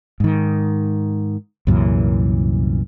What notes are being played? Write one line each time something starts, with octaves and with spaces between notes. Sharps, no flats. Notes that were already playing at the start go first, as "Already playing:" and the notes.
G#2 D#3
C2 F#2 A#2 E3